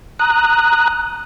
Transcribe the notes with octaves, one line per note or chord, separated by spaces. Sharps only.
A#5 D#6 F#6